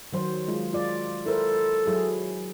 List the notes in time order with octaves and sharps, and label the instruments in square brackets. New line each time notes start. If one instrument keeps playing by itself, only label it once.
[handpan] D#3 F#3 C5
G#3 F4
F4 D5
[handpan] E4 A#4 C5 [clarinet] A4
[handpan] F#3 E4 G#4